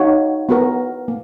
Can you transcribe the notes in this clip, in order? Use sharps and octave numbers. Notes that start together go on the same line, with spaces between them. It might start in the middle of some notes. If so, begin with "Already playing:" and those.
Already playing: D#4 F#4 C#5 F5
B3 F#4 A#4
A#3